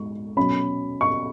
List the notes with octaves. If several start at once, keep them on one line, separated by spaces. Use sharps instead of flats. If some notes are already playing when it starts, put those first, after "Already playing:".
Already playing: G#2 C#6
B2 F#3 C#4 B5
C#6